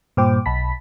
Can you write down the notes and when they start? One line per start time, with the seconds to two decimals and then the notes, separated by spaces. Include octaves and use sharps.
0.17 G2 A#2 C5 G5 D6
0.46 B1 A5 B5 B6